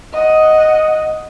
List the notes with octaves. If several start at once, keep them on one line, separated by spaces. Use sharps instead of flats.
D#5 F#5